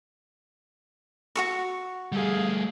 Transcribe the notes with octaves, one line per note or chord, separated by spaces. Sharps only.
F#4 A4 C#6
G3 A3 G#4 F5